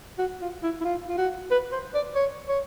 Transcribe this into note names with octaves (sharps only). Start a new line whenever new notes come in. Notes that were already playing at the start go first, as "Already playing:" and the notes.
F#4
F4
E4
E4
F4
F4
F#4
B4
C5
D5
C#5
C#5